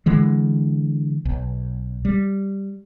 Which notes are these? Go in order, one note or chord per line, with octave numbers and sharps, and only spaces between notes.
D3 E3 G#3
B1
G3